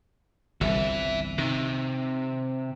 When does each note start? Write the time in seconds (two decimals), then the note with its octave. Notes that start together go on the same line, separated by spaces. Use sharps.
0.61 G1 C2 E3 E5
1.38 C3 D#3